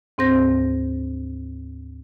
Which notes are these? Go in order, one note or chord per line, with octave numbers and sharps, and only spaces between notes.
D2 G#2 C4 C5 G6 A#6